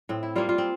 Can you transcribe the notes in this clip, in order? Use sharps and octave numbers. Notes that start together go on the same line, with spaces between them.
A2 C4
E4
G3 A#3 F4
F4
C4